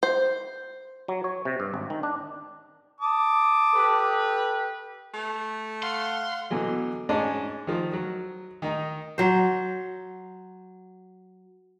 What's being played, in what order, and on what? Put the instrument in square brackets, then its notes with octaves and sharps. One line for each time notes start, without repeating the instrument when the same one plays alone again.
[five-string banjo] C5
[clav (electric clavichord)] F#3
C#5
C3
G2
G#1
D#3
D4
[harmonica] A5 D6 D#6
[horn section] G4 A4 B4
[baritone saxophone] A3
[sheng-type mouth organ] F5 F#5 [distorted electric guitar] C6
[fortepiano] B2 D3 E3 F#3
G#2 C#4 D4 G#4 D#5 A5
D#3 F3
F#3
D#3 D#4
[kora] F#3 C5